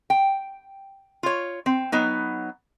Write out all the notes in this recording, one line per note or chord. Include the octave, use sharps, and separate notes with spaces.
G5
F4 C#5
C4
F#3 B3 D#4